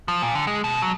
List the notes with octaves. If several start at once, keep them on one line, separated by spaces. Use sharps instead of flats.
F3
A#2
D3
G#3
B2
F#3